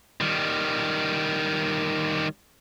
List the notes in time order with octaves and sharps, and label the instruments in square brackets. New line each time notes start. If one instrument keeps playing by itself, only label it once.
[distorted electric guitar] D#3 G3